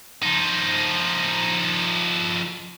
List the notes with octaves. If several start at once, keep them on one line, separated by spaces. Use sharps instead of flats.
F3 D#4